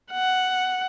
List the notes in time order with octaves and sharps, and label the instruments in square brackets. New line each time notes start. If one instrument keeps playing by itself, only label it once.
[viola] F#5